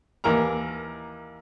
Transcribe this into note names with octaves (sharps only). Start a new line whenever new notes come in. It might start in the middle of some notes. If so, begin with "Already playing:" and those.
D#2 E3 A#4 A#5